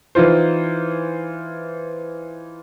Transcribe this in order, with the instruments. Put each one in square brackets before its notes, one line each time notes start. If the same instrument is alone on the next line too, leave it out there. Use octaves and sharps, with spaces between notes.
[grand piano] E3 D#4 F4 C5